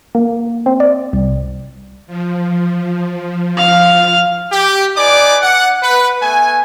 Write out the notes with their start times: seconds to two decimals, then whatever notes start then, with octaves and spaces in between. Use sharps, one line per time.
0.15 A#3
0.66 C4
0.80 D5
1.13 C2
2.07 F3
3.57 F5 F6
4.51 G4
4.96 D#4 B4 D5 G#5 D6
5.41 F#5
5.82 B4
6.21 A3 B3 G#5